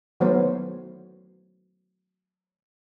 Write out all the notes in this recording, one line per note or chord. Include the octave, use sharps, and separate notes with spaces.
D#3 F#3 A3 B3 C5 C#5